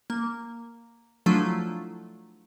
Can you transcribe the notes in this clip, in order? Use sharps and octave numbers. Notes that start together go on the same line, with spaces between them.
A#3
F3 F#3 A3 D4 E4 F4